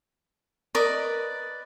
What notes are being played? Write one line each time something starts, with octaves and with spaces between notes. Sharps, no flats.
A#4 B4 D5 D#5